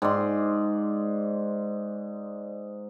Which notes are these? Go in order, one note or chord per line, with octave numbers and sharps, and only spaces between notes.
G#2 D5 C6